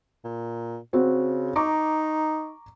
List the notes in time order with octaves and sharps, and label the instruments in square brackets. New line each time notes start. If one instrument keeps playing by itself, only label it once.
[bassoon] A#2
[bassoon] C#3 [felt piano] C4 F#4
[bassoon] D#4 [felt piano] A#5 C#6 D6